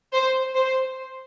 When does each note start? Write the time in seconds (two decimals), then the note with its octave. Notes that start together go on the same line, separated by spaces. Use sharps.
0.12 C5
0.55 C5